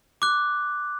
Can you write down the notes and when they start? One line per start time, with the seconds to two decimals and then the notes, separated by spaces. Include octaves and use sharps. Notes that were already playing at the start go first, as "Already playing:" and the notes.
0.22 D6 F#6